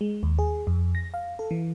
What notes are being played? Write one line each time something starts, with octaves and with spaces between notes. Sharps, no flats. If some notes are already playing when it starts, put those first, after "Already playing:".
G#3
D#2
G#4
F2
A#6
F5
A4
E3